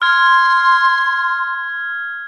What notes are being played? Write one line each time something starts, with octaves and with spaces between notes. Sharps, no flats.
C6 F6 G#6